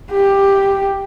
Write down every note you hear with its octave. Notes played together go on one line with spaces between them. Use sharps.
G4